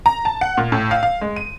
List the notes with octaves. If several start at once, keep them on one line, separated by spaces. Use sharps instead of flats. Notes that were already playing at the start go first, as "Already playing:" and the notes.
A#5
A5
F#5
A#2
A2
F5
F5
G#3
D#7